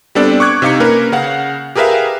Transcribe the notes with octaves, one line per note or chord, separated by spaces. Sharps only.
G3 B3 C4 D4 A4 D5
C#6 D6 F#6 G#6
C3 D#4 F5 D6 C#7
A#3 C#4 A#4 B4
C#3 F5 F#5
G4 G#4 A#4 B4 E5 F5